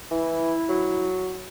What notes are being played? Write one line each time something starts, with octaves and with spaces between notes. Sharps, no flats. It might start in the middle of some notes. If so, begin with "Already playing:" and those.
E3 E4
F#3